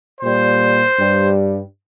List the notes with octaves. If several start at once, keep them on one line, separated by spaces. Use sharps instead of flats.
A#2 G3 C5
G2 G3